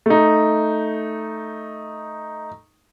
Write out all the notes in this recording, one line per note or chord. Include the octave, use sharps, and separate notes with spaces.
A3 D#4